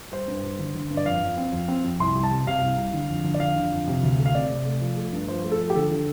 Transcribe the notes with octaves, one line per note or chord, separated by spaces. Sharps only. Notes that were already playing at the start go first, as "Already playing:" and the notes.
G3 C5
G2
G3
D3
D3
G2
D5
F2 F5
F2
C4
F2
C4
F2
C2 C6
G3
A5
C3
C3 F5
C2
G3
D3
F2
D3
D5
F2 F5
D3
F2
C3
D2
A3
F5
C4 D5
C3
A3
F3
A3
G2
F3 C5
A3
A4
F3
G4
D3 A4
D3